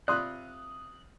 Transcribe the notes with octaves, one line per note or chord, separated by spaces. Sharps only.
C3 F4 D5 B5 C6 D#6 F#6